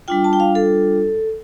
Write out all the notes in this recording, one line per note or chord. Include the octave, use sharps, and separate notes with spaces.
G3 D4 F4 G5
A5
G5
F5
A4